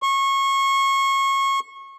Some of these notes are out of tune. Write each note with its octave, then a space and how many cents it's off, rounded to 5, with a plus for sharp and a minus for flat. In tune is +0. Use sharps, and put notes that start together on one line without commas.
C#6 -25